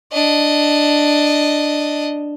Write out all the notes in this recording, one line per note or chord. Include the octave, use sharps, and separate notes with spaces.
D4 D#5